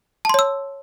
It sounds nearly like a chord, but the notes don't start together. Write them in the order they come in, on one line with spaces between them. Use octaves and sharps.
A5 C6 C#5 E6